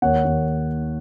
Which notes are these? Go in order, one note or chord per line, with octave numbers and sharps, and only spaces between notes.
D#2 C#5 F#5
D#2